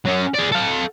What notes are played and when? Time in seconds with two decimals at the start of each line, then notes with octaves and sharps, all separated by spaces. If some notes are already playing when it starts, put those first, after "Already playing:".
0.06 F#3 C#4
0.35 G#4 D5
0.52 A4 F5